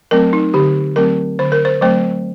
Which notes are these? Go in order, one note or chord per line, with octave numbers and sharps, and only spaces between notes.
F#3 A3 C4 A#4
D#4
D3 G4
F#3 A3 C4 A#4
D3 C5
A#4
C5
F#3 A3 C4 C5